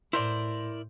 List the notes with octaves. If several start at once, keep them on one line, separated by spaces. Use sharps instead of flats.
A2 E4 A#4 C5 D5